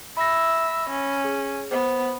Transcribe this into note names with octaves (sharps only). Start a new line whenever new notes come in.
E5 B5 A#6
C#4
G#4
B3 C5